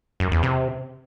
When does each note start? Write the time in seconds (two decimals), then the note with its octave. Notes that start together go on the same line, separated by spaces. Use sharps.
0.20 F#2
0.31 E2
0.43 C3